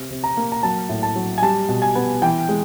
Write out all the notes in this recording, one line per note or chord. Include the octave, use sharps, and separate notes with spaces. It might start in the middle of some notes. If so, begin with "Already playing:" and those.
Already playing: C3
C3
A#5
A#3
A#5
F#3 A5
A2
A5
F#3
G#5
G3 A5
B2
G#5
B3
E3 G5
G#3